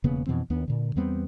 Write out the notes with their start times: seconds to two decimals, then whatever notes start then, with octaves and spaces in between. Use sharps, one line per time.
0.04 E1 C#3 A#3 B3
0.26 F2 B2 E3 C4
0.50 D#2 B3 D4
0.68 A#2 D3
0.96 E2 G3 B3 C4